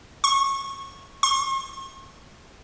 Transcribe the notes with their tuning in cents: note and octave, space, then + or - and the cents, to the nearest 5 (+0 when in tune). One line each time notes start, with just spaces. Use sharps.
C#6 -20
C#6 -45